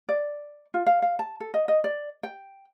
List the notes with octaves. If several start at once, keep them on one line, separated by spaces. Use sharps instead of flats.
D5
F4
F5
F5
A5
A4
D#5
D#5
D5
G5